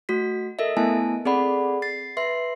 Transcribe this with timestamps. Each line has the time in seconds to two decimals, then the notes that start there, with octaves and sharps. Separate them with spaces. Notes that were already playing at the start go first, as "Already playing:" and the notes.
0.09 A3 F#4 B6
0.59 A4 A#4 D#5 E5
0.77 A3 B3 E4 G#5 A5
1.25 C4 G#4 A4 D5 F#5 B5
1.82 A6 C7
2.17 B4 E5 C6 C7